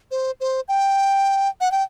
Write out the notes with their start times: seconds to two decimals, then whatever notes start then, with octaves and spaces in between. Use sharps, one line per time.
0.11 C5
0.40 C5
0.68 G5
1.61 F#5
1.72 G5